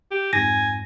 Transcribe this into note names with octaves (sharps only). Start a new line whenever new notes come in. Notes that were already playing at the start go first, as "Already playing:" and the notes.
G4
F2 G#2 G#5 A#6